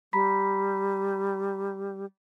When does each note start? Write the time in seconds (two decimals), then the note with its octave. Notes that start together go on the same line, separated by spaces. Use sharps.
0.13 G3 A#5 B5 B6